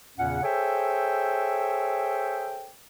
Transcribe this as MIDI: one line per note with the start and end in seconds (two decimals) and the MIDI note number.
0.17 0.40 40
0.17 0.40 46
0.17 0.40 49
0.17 0.40 61
0.17 0.40 78
0.43 2.69 68
0.43 2.69 69
0.43 2.69 72
0.43 2.69 73
0.43 2.69 76
0.43 2.69 79